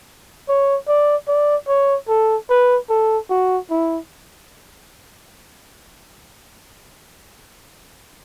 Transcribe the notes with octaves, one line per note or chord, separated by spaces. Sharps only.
C#5
D5
D5
C#5
A4
B4
A4
F#4
E4